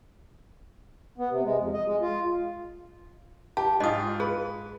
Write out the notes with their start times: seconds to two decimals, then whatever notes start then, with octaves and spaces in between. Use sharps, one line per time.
1.18 B3
1.29 C3
1.44 G#3
1.59 F2
1.74 D#5
1.86 G#3
2.00 F4
3.57 G4 A5
3.80 G#2 F4 D#5 D#6
4.20 G#4 B4